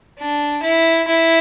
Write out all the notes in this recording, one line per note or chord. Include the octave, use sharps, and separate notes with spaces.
D4
E4
E4